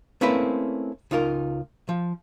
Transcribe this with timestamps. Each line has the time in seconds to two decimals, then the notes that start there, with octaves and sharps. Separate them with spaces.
0.21 A3 A#3 C4 C#4 E4 B4
1.11 C#2 D#4 F4 A#4
1.89 F3